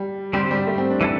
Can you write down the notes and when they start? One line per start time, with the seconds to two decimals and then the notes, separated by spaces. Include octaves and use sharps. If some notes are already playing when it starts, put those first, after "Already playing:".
Already playing: G3
0.33 D3 G3 C4 G4 C5
0.51 G3
0.67 A3
0.78 C4
0.90 D4
1.01 E3 G3 E4 A4